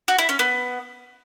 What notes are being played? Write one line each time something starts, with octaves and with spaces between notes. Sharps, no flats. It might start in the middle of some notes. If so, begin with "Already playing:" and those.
F#4
E4
C#4
B3